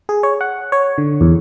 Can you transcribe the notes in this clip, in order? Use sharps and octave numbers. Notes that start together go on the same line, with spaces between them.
G#4
C#5
F#5
C#5
D3
E2